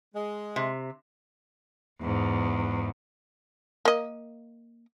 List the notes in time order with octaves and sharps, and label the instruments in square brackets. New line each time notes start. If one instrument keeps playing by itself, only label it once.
[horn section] G#3
[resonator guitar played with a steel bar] C3
[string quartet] E2 G#2
[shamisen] A#3 D#5